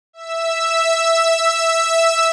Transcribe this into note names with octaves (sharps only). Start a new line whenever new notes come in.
E5 E6